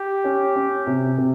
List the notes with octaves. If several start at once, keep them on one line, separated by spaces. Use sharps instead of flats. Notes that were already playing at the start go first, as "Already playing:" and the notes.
Already playing: G4
C#4
C#4
C3
C3